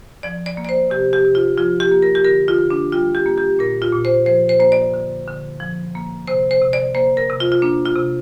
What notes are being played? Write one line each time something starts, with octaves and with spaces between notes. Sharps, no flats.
F3 D5
D5
A#3
D5
C5
C3 G4
G4
C3
F4
F3 F4
G4
A#3
A#4
G4
D3 A#4
F4
D3
D4
G3 F4
G4
A#3
G4
A#2 A#4
F4
A#2
C5
F3 C5
C5
A#3 C5
D5
D3
D3
F3
A#3
C3 C5
C5
C3
D5
A#3 C5
A#4
C3
F4
F4
A#3 D4
F4
C3